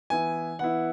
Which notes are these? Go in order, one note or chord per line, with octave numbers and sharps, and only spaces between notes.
E3 B3 E4 G#5
E3 B3 E4 F#5